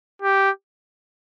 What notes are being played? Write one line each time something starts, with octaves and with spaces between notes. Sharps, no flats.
G4